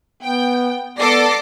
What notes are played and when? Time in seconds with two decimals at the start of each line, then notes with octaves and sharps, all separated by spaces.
0.23 B3 G5
0.99 B3 A4 D5 D6 A#6 C7